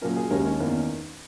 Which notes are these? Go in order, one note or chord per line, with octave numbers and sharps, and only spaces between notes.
A#2 F#3 C#4 A#4
G#4
D#2 D#3 G#3 C#4 A#4
C#5
E2 D#3 A#3 C#4